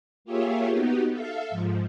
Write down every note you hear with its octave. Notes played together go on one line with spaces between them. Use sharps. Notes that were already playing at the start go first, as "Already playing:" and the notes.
A#3 F4 G4 G#4 C#5 E5
B3 D#4 F#4 G4
A4 E5 F5
G#2 F3